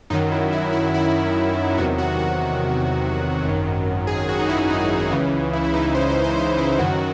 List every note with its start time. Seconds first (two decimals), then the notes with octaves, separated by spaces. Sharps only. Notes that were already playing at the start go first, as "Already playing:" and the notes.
0.10 F#2 D#3 F#3 D#4
0.32 E4
0.52 E4
0.73 E4
0.94 E4
1.78 E2 C3 D#3 F#3 F#4
1.98 F#4
2.19 F#4
3.44 G#1 F#2 D#3 F#3
4.07 G#4
4.29 F#4
4.39 D#4
4.49 E4
4.59 E4
4.70 D#4
5.12 C#2 C#3 E3
5.53 E4
5.64 E4
5.74 D#4
5.84 E4
5.95 C5
6.09 C5
6.24 C5
6.37 C5
6.58 E4
6.79 F#2 D#3 F#3 F#4